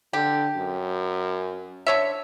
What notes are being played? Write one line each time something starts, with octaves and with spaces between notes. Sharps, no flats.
D3 G4
F#2
D3 C#5 E5